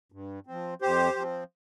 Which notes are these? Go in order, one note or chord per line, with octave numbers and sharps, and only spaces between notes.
G2
F3 C4
F2 G4 C5
F3 C4